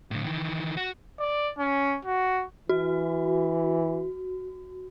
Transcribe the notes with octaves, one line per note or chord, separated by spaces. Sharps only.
A2 D3
D#3 E3
F#4
D5
C#4
F#4
E3 F#4